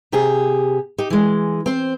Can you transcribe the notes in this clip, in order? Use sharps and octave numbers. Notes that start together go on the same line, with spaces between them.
C3 G4 G#4
D#4 G4
E3 G#3
C4 C5